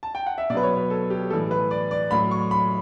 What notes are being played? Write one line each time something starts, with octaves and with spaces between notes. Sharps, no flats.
A5
G5
F#5
E5
B2 F#3 B4 D5
C#5
B4
A4
G4
A2 E3 G3 A4
B4
D5
D5
A2 F#3 B5
C#6
B5